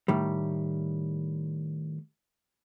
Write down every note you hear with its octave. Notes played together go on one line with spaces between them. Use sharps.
A2 D#3 G3